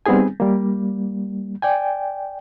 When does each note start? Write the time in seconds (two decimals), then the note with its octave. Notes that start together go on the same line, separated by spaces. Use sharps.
0.06 G3 B3 C4 D#4 G#4 G#5
0.40 G3 A#3
1.62 D5 G5 G#5